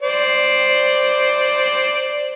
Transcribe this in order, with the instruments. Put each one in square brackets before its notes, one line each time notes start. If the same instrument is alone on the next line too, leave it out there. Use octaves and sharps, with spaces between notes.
[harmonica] C5 D5